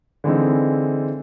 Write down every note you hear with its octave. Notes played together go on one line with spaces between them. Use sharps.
D3 E3 G#3 C4 D#4